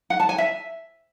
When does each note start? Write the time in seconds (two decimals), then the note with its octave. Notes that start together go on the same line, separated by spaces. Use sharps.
0.10 F#5
0.20 A5
0.29 G#5
0.38 E5